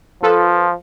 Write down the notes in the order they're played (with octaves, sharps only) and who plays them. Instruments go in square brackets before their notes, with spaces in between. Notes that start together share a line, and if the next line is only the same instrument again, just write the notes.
[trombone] F3 [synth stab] F4 A4 B4